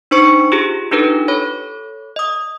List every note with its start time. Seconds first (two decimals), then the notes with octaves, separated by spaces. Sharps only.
0.11 D4 D#4 C5 C#6 C#7
0.52 F4 G4 G#4
0.91 D4 D#4 F4 G4 A4 B4
1.28 A4 C#5 B5
2.16 D#5 D#6